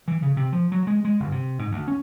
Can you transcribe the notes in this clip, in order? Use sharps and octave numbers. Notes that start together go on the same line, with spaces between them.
E3
C#3
C3
F3
F#3
G#3
G#3
G1
C3
G#2
D2
C#4